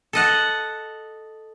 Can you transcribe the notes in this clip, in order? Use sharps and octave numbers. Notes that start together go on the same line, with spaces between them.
A4 D#5 F#5